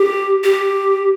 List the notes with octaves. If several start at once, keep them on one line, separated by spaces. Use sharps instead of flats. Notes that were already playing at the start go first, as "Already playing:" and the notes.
Already playing: G4
G4